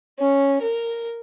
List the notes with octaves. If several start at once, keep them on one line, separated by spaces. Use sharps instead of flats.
C#4
A#4